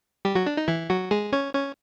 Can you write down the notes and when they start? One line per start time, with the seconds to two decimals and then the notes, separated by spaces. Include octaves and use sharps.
0.25 G3 G4
0.35 F#3 F#4
0.46 D4
0.57 D#4
0.68 E3 E4
0.90 F#3 F#4
1.11 G#3 G#4
1.32 C#4 C#5
1.54 C#4 C#5